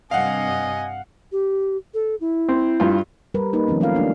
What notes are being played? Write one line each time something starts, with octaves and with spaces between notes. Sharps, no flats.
G2 C3 D#5 F5 F#5 G#5
G4
A4
E4
C4
G2 F4
G3 A#4 B4
A#3 D#4 B4
D#3 F3 C4 C#4
F#3 A3 C#4 F4 A#4 F5
G#3 A#3 D4